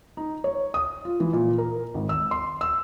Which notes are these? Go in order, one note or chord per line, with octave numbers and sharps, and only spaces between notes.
D#4
C#5
D#6
F4
E3
A#2
A#4
G#1
E6
C6
E6